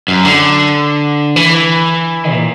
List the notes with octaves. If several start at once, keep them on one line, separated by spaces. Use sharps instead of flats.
F#2
D3
E3
A#2